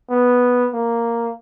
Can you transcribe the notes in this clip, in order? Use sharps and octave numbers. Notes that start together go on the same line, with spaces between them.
B3
A#3